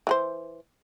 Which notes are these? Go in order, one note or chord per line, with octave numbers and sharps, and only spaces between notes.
E3 G#4 C5